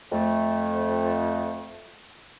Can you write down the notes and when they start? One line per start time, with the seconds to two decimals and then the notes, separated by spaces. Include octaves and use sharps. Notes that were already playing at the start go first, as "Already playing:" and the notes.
0.12 F2 A3